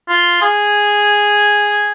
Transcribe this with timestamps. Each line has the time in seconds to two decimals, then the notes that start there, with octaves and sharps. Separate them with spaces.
0.09 F4
0.42 G#4